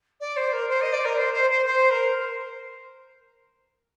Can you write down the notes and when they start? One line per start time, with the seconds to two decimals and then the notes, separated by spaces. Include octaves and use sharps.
0.20 D5
0.37 C5
0.53 A#4
0.69 C5
0.81 D#5
0.93 D5
1.05 A#4
1.18 C5
1.34 C5
1.50 C5
1.66 C5
1.91 A#4